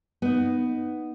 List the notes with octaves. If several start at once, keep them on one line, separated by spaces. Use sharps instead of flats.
B3 D#4